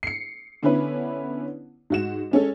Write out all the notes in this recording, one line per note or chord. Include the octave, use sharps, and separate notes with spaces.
C7 C#7
D3 B3 C#4 E4 B4
G#2 F#4 E7
G#3 C#4 A4